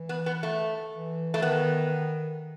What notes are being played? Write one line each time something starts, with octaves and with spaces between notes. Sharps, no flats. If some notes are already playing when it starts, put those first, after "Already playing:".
Already playing: E3
B3
B3
A3
E3
A3
D#3 B3